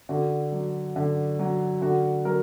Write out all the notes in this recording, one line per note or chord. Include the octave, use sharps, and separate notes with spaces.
D3 F#4
F#3
D3
F#3
D3 F#4
F#3 A#4